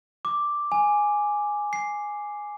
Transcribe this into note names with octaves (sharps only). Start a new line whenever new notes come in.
D6
G#5
C7